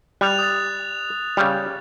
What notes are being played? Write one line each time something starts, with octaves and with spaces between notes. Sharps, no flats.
G3 F#6 A6 F7
D#6 A6
C#3 G3